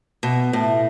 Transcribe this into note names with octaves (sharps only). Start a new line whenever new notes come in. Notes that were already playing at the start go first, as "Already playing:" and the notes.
B2
A2